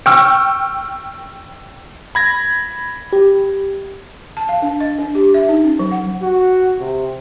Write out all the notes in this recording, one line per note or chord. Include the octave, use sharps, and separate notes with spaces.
G5 C#6 E6 F6
B5 G#6 A#6
G4
A5
F5
D4
D#5
D4
G4
E5
D#4
C#4
F#3
F#5
F#4
C3